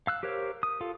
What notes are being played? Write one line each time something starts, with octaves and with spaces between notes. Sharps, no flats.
F5 E6 F#6
G4 A#4 C5 C#5 F5
D#6
F4 A4 F5